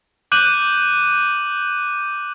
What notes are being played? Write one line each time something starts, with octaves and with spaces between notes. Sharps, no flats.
D6 F#6 G6 D#7 F#7